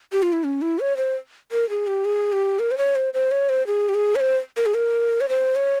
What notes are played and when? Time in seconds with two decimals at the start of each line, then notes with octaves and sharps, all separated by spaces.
0.12 G4
0.23 F4
0.33 E4
0.44 C#4
0.62 E4
0.80 C#5
0.97 C5
1.52 A#4
1.70 G#4
1.87 G4
2.05 G#4
2.32 G4
2.59 A#4
2.71 C5
2.78 C#5
2.95 C5
3.14 C5
3.31 C#5
3.49 C5
3.67 G#4
3.89 G4
3.94 G#4
4.16 C#5
4.20 C5
4.57 A#4
4.66 G#4
4.74 A#4
5.21 C#5
5.29 C5
5.56 C#5